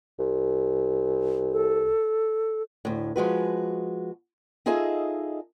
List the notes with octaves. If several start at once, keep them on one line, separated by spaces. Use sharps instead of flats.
C2
A4
D2 A2
F3 G#3 F#4 B4
D#4 F4 G#4 A4 D#5 E5